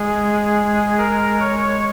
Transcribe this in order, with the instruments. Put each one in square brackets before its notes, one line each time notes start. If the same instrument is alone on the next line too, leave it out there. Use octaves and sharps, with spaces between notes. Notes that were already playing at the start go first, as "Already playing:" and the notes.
Already playing: [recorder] G#3 [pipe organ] G#4
[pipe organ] A#4
C#5